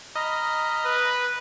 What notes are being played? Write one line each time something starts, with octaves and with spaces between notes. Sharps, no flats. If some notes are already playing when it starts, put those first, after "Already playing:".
D#5 A#5 B5 F6
B4